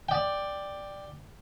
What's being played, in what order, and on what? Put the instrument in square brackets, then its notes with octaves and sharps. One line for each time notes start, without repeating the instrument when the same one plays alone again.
[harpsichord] D5 G5